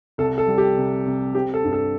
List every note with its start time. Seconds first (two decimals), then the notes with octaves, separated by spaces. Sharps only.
0.18 C2 A4
0.38 A4
0.47 G3
0.58 G4
0.77 C3
1.06 C3
1.35 C4 G4
1.54 A4
1.64 G2
1.73 A4